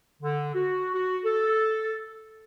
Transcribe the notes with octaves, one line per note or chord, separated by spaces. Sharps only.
D3
F#4
F#4
A4